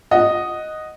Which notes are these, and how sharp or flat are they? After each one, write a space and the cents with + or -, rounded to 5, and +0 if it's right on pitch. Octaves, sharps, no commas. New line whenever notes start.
D#5 +0 F#5 +0